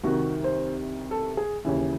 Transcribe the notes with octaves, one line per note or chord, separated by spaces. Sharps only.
C2 C3 D#3 F#4
C5
A4
G#4
D#2 C#3 E3